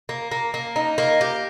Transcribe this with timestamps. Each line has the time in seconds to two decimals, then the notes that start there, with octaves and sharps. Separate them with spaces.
0.09 A#3
0.31 A#3
0.54 A#3
0.76 D#4
0.98 A#3
1.21 G4